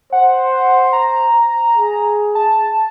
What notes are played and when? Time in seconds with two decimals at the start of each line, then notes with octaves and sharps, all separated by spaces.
0.12 C5 F#5
0.93 A#5
1.78 G#4
2.35 A5